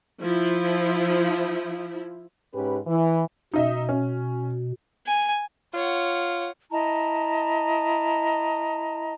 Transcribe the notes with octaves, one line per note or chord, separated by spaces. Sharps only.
F3 E4
G#2 C#4 G4 B4
E3
B2 D#4 D#5 E5
C#4
G#5
F4 C#5 F#5
E4 D#5 A5 A#5